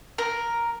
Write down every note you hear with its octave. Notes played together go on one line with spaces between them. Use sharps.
A#4